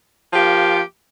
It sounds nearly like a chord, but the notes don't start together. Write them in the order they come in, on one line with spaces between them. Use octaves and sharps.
F3 G4 A#3